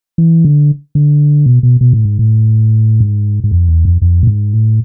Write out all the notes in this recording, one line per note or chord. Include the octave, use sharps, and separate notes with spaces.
E3
D3
D3
B2
B2
B2
A2
G#2
A2
G#2
G#2
F2
E2
F2
F2
A2
G#2
A2